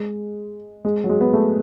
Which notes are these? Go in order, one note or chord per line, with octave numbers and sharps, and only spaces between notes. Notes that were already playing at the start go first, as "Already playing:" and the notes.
Already playing: G#3
G#3
F#3
G#3
B3
A3